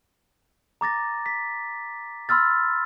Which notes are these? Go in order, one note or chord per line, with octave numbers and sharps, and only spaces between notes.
A#5 D6 A6 A#6
B6
B5 C6 E6 F6 A6